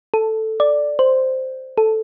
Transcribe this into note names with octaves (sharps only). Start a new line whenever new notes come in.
A4
D5
C5
A4